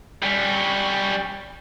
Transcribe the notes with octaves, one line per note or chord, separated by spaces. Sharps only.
G3 C#4